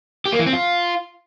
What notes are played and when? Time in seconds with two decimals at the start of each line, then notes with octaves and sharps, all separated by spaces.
0.26 G4
0.32 A#3
0.39 E3
0.46 C4
0.53 F4